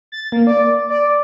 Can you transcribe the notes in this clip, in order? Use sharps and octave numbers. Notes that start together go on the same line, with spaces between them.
A6
A#3
D5
D5